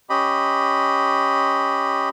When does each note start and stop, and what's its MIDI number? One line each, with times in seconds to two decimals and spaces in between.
0.10 2.09 61
0.10 2.09 67
0.10 2.09 75
0.10 2.09 83